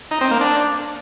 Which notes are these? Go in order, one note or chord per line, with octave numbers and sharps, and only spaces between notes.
D#4
C4
A#3
D4